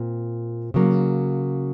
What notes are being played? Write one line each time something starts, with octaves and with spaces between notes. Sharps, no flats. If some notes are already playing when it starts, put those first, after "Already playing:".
Already playing: A#2 C4
C#3 F#3 A#3